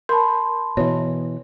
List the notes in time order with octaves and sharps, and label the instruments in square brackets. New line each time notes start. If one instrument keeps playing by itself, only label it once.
[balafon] A#4 [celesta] A5 B5 C6
[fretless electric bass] B2 E3 [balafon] C#5